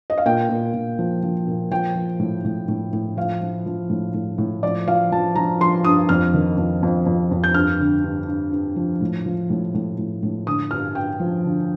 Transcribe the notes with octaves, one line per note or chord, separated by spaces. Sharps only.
D#5
F5
A#2 G5
A#2
A#2
F3
F3
A#2
F3 G5
F3
A2
A2
A2
A2
F3 F5
F3
F3
A2
A2
A2
F3 D5
F3 F5
F3 A5
F3 A#5
F3 C6
G2 D#6
F2 F6
D#3
F2
F2
F2
F2
G6
G2 F6
D3
G2
G2
G2
F3
A2
F3
A2
A2
A2
A2
D3 D#6
G2 F6
G2 G5
F3
D3